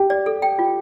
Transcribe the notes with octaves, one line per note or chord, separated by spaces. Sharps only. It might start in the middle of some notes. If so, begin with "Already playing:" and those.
Already playing: G4
D5
A4
G5
F4